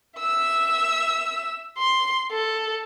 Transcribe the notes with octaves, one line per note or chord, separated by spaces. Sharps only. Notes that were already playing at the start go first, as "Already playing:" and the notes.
E5 E6
C6
A4